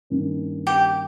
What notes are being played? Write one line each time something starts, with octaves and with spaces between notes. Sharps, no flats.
G2 D#3 A#3 C#4
G4